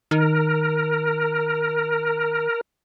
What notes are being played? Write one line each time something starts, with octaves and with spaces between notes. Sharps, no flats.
D#3 A#4